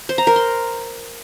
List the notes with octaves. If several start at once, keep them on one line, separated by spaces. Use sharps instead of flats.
C5
A#5
A#4
C6